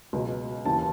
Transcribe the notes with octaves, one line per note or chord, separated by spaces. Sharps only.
C#2 B2 F#3
D#2 C#3 E3 A5